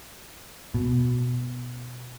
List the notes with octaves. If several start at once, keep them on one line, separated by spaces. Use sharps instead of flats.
B2